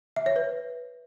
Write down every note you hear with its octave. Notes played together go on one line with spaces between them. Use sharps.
E5
C#5
B4